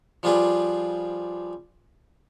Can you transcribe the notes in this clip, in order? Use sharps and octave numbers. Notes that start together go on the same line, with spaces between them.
F3 G3 F4 G#4 B4 D5